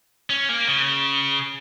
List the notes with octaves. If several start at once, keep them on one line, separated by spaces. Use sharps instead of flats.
C#4
A#3
C#3